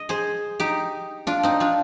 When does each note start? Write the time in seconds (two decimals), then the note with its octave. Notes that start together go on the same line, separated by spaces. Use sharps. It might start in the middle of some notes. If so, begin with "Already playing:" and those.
Already playing: D#5
0.09 G#4 C5
0.60 D#4 G4
1.27 D4 F4
1.43 C4 D#4
1.60 D4 F4